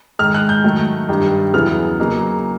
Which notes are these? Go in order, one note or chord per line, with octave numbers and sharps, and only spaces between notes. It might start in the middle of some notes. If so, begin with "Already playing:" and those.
G#2 D#3 G#3 F6
F#6
G6
D#3 F#3 A3
G2 D#3 G3
E2 C#3 F#3 B3 E4 F6
C#3 F#3 A#3 D#4